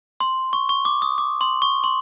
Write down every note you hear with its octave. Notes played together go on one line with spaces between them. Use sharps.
C6
C#6
C#6
D6
D#6
D6
C6
C#6
C6